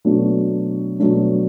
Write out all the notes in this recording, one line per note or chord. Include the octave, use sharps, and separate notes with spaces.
B2 F#3 A3 D4
B2 F#3 A3 D4